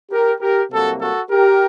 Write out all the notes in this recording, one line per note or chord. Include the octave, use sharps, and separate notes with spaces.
G4 A#4
G4 A#4
C2 C3 F#3 A#3 F#4 A4
F#4 A4
G4 A#4